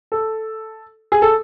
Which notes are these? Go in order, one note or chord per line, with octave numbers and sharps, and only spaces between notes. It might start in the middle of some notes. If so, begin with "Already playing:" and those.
A4
G#4
A4